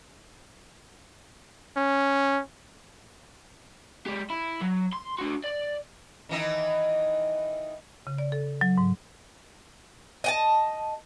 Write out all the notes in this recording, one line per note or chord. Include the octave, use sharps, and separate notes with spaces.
C#4
G#3 G4
E4
F#3
C6
D4 F#4
D5
D#3 E3 D#4
C#3
D5
A4
F#3
G#2
D#5 G5 A5